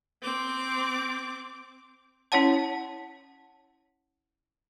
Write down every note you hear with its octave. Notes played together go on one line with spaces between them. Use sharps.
C4 D6
C#4 E4 C#5 F#5 A5